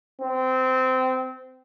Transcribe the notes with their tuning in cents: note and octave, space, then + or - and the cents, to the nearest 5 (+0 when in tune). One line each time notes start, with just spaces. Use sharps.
C4 -20